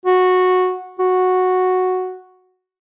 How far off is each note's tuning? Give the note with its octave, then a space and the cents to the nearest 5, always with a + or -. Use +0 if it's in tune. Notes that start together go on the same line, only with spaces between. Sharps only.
F#4 -10
F#4 -5